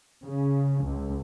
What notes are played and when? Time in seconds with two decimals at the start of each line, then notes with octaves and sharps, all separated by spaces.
0.25 C#3
0.84 C#2